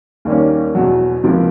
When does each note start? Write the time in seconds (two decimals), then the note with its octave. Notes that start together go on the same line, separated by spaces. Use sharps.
0.25 D#2 D#3 G3 A#3 C#4
0.75 E2 B2 F#3
1.24 C#2 C3 F3 A#3